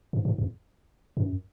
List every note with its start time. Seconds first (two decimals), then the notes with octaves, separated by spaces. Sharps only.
0.13 G2
0.25 G#2
0.38 E2
1.17 F#2